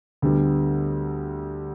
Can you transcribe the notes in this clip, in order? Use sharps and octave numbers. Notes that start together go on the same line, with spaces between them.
D2 D3 G3 B3